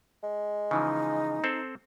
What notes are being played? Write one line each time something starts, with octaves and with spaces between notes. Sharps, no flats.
G#3
C#3 E3 F3 D#4
C4 A4 C5